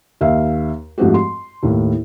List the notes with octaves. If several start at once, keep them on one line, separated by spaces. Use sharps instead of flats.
D#2 E5 F5
G#2 F3 A3 C4 F#4 G4
C6
D#2 A2